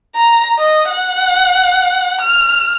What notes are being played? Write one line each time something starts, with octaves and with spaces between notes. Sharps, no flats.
A#5
D#5
F#5
F6